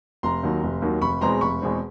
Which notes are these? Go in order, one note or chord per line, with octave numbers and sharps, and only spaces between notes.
F1 A#5 C6
D#2 D#3 F#3
F1
D#2 D#3 F#3
F1 B5 C#6
E2 B2 G#3 C4 A#5 C6
F1 B5 C#6
E2 B2 G#3 C4